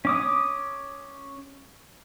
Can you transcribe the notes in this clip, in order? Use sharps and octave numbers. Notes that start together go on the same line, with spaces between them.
C#4 D6 D#6